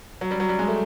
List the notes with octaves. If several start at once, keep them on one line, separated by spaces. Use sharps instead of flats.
F#3
G3
F#3
G3
G#3
A3